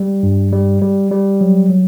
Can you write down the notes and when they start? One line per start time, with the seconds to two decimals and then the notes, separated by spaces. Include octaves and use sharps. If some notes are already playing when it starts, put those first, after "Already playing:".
Already playing: G3
0.23 G2
0.53 G3
0.82 G3
1.11 G3
1.41 F#3
1.70 F#3